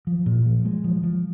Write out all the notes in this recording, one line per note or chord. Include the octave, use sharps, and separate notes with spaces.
F3
A#2
F3
G#3
F3
F3